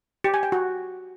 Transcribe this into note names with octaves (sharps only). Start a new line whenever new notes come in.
G4
G#5
G5
F#4